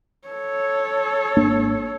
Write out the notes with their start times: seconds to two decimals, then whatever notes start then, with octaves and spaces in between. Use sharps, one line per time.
0.28 A4 C#5
1.37 G#1 A#3 D4